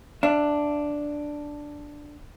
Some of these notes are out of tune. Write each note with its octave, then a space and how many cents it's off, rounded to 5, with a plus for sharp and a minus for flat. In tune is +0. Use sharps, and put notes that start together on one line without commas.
D4 +0 E5 +40